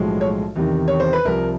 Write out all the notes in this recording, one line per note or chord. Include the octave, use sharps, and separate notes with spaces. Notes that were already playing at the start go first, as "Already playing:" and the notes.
Already playing: B1 A2 F3 G#3
C#5
E2 C3 D#3
C#5
C5
B4
C2 C3 F3 A#4